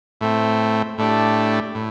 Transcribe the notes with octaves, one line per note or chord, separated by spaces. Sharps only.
A2 A3 C4
A2 A3 D4 G4
A2